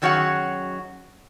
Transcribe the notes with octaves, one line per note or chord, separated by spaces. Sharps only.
F#2 D#3 F#3 C#4 G#4 F#5